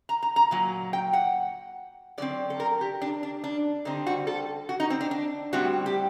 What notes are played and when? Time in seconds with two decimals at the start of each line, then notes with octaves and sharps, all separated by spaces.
0.09 A#5
0.23 A#5
0.36 A#5
0.51 A#2 F#3
0.93 G5
1.13 F#5
2.18 D3 F#3 C4 D5
2.50 A4
2.60 A#4
2.81 G4
3.02 D4
3.23 D4
3.44 D4
3.85 D3 G3 C4 D#4
4.07 F#4
4.27 A4
4.69 F#4
4.80 D#4
4.90 C4
5.01 D4
5.11 D4
5.53 A2 G3 C4 F#4
5.86 G4